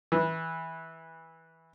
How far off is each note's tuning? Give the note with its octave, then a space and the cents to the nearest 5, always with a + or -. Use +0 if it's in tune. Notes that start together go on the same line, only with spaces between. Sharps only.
E3 -15